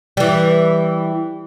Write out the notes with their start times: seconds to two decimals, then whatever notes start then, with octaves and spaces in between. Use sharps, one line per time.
0.17 E3 G3